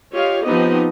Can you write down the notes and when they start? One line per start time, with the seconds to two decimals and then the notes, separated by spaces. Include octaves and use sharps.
0.12 F4 G4 C#5 D#5 F5
0.43 F3 B3 C4 D#4 G4 D#5